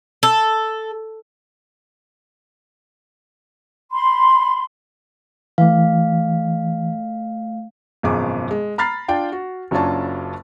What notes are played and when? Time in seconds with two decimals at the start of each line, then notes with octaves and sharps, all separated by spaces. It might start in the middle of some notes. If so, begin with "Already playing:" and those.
0.23 A4
3.92 B5 C6
5.58 E3 A3 F5
8.03 G#1 F#2 B2 F3 G#4 D6
8.51 G#3
8.78 A#5 B5 F6 A6 C7
9.08 D4 F4 G5
9.32 F#4
9.71 F#1 F#3 C#4 D4 F4 A5